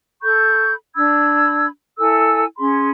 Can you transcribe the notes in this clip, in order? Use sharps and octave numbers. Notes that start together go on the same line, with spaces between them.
A4 B5 C#6 G6
D4 B5 E6 G#6
E4 A4 G#5 E6
C#4 G#4 B5 C6